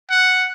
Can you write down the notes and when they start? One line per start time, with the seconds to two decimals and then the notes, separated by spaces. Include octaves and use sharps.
0.11 F#5